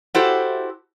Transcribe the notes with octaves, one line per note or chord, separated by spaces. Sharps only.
E4 F#4 G4 A4 C5